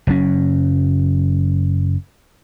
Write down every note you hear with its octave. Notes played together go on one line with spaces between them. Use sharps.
F#1 F#3 C#4